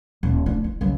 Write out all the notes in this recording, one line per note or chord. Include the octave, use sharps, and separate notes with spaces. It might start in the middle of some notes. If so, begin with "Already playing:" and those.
D#1
D2 D4
D#4
C#2 F#3